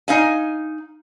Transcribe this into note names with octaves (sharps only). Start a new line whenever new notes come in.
D#4 F5 G#5